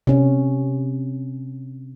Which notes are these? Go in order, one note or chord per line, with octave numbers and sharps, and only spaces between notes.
C3 C#4